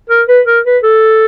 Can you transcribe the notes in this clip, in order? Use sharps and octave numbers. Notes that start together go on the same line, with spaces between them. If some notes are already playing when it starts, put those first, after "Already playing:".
A#4
B4
A#4
B4
A4